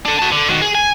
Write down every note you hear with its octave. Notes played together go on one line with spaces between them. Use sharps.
D4 A4
F#4 A5
D3
D#3 F#4
G#4
G#5